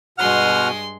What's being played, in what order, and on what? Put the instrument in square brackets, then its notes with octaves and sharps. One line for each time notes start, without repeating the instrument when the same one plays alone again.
[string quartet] G2 G#3 C6 [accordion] B2 [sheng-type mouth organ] F#5 F6